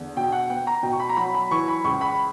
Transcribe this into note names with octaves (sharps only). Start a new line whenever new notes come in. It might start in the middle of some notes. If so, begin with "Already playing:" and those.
Already playing: E2 D3
B2 G5
F#5
B3 G5
A#5
B2 G5
C#6
B5
A#5
F#3 B5
B5
E3 C#6
B5
C#2 C#6
B5